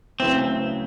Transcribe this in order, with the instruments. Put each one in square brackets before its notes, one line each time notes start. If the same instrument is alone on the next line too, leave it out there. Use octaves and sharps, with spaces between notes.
[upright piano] D2 C#3 F#3 B3 E4 [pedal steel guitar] C4